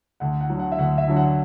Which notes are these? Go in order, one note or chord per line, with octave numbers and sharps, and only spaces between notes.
D2 F#5
F#5
D3 F#3
F#5
E5
D2 F#5
E5
D3 F#3
F#5